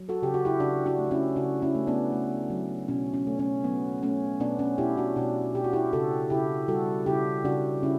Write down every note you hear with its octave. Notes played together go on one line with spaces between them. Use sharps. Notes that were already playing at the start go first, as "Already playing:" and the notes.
Already playing: F#3
F#4 A4
C#3 G4
F#4
E4 G4
C#3 D4 F#4
D4 F#4
A3
C#4 E4
C#3 D4 F#4
C#4 E4
A3
B3 D4
A3
F#3
B2 C#4
C#4
A3
C#4
F#3 B3
A3 C#4
B2 B3 D4
C#4
B2 E4 G4
D4 F#4
B2 D4 F#4
B2 G4
F#4
E4 G4
C#3 F#4 A4
C#3 E4 G4
G3 F#4 A4
C#3 E4 G4
C#3 D4 F#4
C#3 C#4 E4